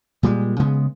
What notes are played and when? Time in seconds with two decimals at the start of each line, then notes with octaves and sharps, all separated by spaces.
0.23 A#2 G3 G#3
0.60 C#3 G#3 B3